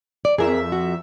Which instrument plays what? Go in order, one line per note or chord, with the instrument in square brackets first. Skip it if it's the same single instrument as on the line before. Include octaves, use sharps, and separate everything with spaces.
[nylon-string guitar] D5
[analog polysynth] F2 E5 [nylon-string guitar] G#4 A#4
[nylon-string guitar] F#4